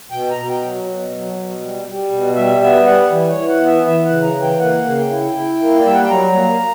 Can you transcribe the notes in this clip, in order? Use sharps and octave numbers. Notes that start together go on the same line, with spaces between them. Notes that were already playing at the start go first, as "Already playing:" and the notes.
B2 G5
A#5
B2
G5
F#3
B2
F#3
B2
G3
G3
B2
G3 E5
B3 E5
G3 F#5
E3
C#5
E3
F#5
B3
E5
E3 E5
F#5
C#3
A#5
E3
G5
A#3 F#5
C#3
G5
E4
E4
A#3
D5
G3 E5
F#5
G5
F#3 A#5
A#3